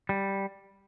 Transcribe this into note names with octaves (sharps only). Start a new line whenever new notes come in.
G3